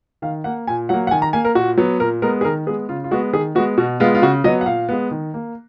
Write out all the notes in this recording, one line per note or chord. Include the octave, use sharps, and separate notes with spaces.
D#3 F5
A#3 F#5
A#2 G#5
F#3 A#3 F#5
F#5
D#3 G#5
A#5
A#3 G#5
A#4
A#2 F#4
F#3 B3
A#2 A#4
G#3 B3 A#4
G#4
D#3 A#4
G#3 B3 G#4
C#3 F4
F4
G#3 B3 F#4
D#3 G#4
G#3 B3 F#4
B2 F#4
G#3 B3 F4
F4
C#3 F#4
F#3 B3 D#5
F#5
A#2 F5
G#3 B3
D#3
A#3